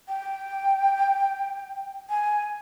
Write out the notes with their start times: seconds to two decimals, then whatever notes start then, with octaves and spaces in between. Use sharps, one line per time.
0.08 G5
2.10 G#5